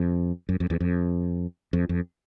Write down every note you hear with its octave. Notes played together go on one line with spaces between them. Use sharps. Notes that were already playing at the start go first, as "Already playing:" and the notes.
Already playing: F2
F#2
F2
E2
F2
F2
F2